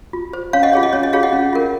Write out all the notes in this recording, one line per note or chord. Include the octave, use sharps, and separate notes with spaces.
F4
C5
C#4 C#5 F5
D#5 F#5
F4 G#4 C#5
D#5
C#4 C#5
D#5
F4 G#4 C#5 F5
D#5 F#5
C#4
F4 A#4